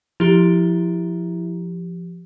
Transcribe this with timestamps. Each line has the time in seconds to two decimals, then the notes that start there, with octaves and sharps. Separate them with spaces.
0.20 F3 E4 G4